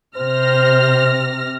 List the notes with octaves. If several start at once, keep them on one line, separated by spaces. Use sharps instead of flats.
C3 C5 F6 A#6